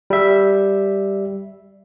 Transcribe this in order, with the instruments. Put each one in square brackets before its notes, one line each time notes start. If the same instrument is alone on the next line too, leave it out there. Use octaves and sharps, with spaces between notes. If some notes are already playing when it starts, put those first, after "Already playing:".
[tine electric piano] G3 E5